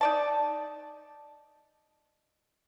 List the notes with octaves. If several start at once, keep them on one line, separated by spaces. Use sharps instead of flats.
D#4 D5 A5